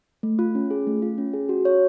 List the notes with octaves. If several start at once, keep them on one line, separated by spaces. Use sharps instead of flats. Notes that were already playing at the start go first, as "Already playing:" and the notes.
A3
F4
C#4
G#4
A3
F4
C#4
G#4
F#4
C#5